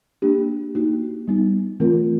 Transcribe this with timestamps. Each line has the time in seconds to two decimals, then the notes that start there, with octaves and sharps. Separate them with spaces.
0.22 A#3 D4 G4
0.75 A#3 D#4 F#4
1.28 G3 B3 D#4
1.80 E3 A3 C4 F4 A#4